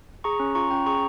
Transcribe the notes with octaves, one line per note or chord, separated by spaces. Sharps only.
G#4 A#5 C#6
C#4
F4 A#5 C#6
C#4 G5 A#5
G#4 A#5 C#6